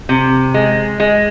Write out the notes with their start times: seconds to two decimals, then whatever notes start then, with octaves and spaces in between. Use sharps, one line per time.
0.09 C3
0.54 G#3
1.00 G#3